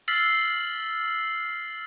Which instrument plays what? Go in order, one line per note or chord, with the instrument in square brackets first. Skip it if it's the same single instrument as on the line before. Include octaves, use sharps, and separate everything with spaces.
[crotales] E6 F6 A6 B6 C7 F#7